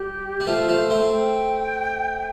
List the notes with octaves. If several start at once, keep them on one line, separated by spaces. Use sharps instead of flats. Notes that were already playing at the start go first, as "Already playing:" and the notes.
Already playing: G3 G4
G3
F3 A3 F4
F3 A3 C5
A3 C4
G5